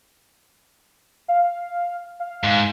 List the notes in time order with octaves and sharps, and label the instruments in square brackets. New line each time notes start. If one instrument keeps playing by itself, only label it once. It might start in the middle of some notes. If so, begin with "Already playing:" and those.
[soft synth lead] F5
F5
[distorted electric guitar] G#2